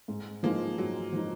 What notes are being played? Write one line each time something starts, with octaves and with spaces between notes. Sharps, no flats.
G#2
F3 G#3 A#3 D#4
G#2 F#3
F3 G#3 D#4